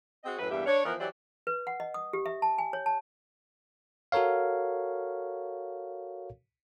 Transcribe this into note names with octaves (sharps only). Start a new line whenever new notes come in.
C4 F#4 G#4 D#5
F#2 A2 B4
E2 G2 A#3 G4 E5
D4 C#5
E3 F3 B3 A#4
E3 F#3 G4 C5 D5
B4
F#5
D#5
D#6
G4
E5
A5
G#5
C#5
A5
F#4 A4 A#4 C#5 F5